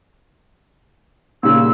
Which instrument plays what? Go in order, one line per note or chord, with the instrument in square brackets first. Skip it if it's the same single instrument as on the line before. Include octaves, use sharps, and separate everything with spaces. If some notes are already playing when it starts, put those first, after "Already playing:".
[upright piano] A#2 C#3 [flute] E6